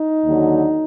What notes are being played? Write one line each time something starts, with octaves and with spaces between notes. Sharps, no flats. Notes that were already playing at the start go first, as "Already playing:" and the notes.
Already playing: D#4
D#2 D3 F#3